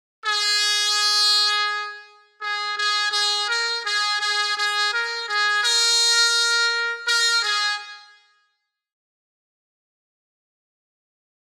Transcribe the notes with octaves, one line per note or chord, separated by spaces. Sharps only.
G#4
G#4
G#4
G#4
A#4
G#4
G#4
G#4
A#4
G#4
A#4
A#4
G#4